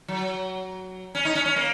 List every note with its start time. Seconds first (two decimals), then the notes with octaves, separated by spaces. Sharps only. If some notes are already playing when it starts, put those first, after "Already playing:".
0.08 F#3
1.15 C#4
1.25 D#4
1.35 C#4
1.46 C#4
1.56 A#3